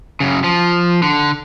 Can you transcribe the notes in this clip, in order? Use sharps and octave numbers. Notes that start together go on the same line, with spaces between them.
F#2 C#3
F3
D3